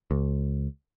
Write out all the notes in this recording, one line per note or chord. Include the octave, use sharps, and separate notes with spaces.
C#2